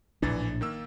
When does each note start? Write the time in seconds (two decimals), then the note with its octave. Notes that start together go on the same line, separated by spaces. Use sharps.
0.22 A#1 E2 A2 E3 D4 A6
0.61 D#3 A#3 E6